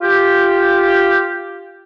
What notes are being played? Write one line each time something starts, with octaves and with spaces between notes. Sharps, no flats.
F4 G4